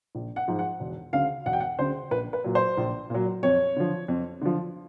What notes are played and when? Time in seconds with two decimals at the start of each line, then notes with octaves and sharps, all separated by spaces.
0.15 A#1
0.36 F#5
0.48 G#2 F3
0.59 F#5
0.80 E1
1.13 D2 C#3 F5
1.46 E1 F#5
1.53 G5
1.60 F#5
1.79 D2 C#3 C5
2.11 A#1 B4
2.33 B4
2.44 A#2 F#3
2.55 C5
2.77 A#1
3.10 A#2 F#3
3.43 F2 C#5
3.76 D3 F3
4.08 F2
4.41 D3 F3